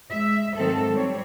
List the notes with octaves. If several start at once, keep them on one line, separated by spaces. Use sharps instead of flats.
G#3 E5
G#2 D#3 F#3 C4 A4
F#3 G3 C4 C#5